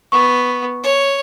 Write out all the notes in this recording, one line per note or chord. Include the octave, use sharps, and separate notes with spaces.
B3 C#6
C#5